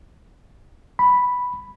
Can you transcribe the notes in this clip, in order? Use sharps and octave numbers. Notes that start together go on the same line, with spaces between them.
B5